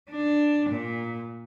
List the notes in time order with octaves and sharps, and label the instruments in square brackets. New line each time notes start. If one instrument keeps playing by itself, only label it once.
[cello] D4
A#2